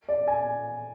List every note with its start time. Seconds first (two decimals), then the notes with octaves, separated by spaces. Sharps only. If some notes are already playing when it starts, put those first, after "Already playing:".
0.09 D5
0.28 G#5